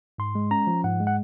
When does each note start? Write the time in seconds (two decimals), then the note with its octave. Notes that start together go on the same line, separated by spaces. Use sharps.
0.18 G#2 C6
0.35 G#3
0.51 C#4 A#5
0.67 F3
0.84 G#2 F#5
1.00 G#3
1.07 F#5